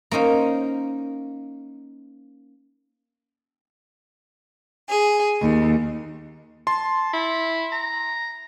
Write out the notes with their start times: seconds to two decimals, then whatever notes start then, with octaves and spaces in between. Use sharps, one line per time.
0.11 A#3 C#4 D#4 C5
4.89 G#4
5.42 D#2
6.67 A5 C6
7.13 E4
7.72 A#5